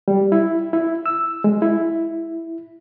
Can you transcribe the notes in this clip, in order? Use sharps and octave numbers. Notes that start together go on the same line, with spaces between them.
G3
E4
E4
E6
G#3
E4